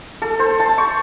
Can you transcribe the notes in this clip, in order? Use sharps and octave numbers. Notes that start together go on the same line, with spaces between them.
A4
C5
A5
C#6